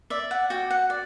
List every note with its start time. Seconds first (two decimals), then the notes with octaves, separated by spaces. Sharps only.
0.10 D5 E5
0.31 F#5
0.50 F#4 G5
0.71 F#5
0.90 D5